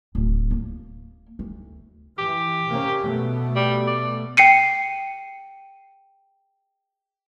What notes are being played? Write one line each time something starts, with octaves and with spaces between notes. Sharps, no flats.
D1
A#3
D2
E3 G4
C3 A#3 C#4
B2 A3 B3
G3
D5
G5 C7 C#7 D#7